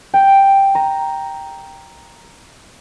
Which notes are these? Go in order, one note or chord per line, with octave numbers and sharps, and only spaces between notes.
G5
A#5